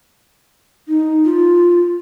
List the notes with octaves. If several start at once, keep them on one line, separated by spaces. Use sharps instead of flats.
D#4
F4